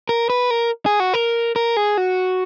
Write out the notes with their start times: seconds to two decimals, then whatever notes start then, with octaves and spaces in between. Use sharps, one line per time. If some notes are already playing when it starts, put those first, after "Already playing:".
0.09 A#4
0.30 B4
0.50 A#4
0.86 G#4
1.00 F#4
1.14 A#4
1.56 A#4
1.77 G#4
1.97 F#4